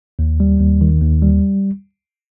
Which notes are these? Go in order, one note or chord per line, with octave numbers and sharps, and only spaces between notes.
D#2
G3
D#2
D#3
D#2
G3